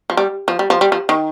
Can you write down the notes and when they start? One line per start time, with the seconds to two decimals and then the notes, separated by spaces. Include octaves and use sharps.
0.10 F3
0.17 G3
0.48 F3
0.59 G3
0.70 F3
0.81 G3
0.92 F3
1.09 D#3